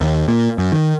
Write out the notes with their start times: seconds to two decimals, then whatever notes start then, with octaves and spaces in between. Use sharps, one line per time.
0.01 D#2
0.28 A#2
0.58 F#2
0.72 D#3